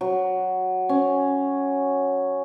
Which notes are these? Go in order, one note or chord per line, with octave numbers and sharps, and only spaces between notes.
F#3
C#4